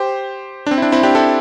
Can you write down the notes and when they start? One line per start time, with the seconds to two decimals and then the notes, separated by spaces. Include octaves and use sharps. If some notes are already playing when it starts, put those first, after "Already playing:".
Already playing: G4 C5
0.66 D4
0.71 C4
0.78 E4
0.82 D4
0.92 C4 E4
1.03 D4 G4
1.15 E4 A4